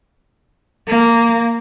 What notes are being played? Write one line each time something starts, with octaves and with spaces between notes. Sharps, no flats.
A#3